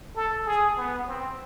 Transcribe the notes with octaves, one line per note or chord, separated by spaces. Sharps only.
A4
G#4
B3
C4